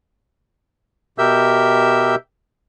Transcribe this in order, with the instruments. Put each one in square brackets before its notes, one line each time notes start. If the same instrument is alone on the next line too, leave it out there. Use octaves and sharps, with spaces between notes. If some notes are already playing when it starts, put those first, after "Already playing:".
[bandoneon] B2 G4 A#4 E5 E6 G6